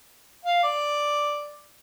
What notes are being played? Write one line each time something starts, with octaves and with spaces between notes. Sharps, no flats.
F5
D5